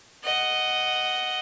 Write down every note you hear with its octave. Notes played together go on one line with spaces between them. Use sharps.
D#5 F#5